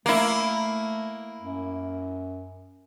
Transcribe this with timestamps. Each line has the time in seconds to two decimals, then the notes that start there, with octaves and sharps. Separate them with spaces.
0.06 A3 A#3 E4
1.40 F#2